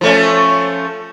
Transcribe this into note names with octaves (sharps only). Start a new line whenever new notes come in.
F3 A3 C#4